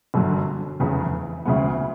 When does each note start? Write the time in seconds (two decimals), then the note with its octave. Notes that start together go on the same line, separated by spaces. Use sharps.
0.14 G1 F#2 D3
0.80 F1 E2 C#3
1.45 D2 C#3 E3 G#3 B3